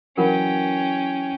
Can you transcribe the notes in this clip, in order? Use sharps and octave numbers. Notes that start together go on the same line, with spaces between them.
E3 F#3 C#4 A#4 F#5 G5 B5